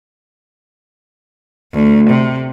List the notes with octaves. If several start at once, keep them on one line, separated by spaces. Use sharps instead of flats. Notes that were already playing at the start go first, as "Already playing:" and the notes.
D2
C3